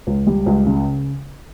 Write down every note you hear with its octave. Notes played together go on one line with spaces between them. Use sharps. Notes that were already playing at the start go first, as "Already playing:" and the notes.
C#2
G3
C#2
C#3